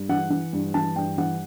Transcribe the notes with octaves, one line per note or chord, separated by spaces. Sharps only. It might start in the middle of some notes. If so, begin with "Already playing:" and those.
Already playing: G2
E3 F#5
E3
G2
E3 A5
G2 G5
E3 F#5